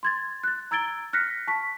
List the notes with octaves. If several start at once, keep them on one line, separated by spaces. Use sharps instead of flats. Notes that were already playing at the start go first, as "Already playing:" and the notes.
C6 G#6 A6
F#6 A6
A#5 E6 G#6 A6 D7 G7
F6 F#6 A#6 B6 C#7
A5 C#6 B6